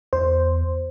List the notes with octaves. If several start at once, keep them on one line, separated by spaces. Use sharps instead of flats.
E2 C5